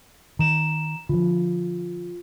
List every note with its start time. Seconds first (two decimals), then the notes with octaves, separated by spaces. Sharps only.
0.39 D#3 A#5 E7
1.09 D3 F3 F4